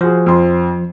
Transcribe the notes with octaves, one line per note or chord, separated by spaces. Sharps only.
F3 F#4 G#4
F2 C6